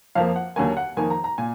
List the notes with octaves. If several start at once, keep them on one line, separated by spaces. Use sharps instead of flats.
F2 F3 A#3 F5
F#5
D#2 D3 F#3 A#3 G#5
F#5
F2 D#3 A#3 G#5
A#5
A#5
A#2 G#5